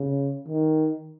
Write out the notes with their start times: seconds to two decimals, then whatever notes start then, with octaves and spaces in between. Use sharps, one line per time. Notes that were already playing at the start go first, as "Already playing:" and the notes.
Already playing: C#3
0.47 D#3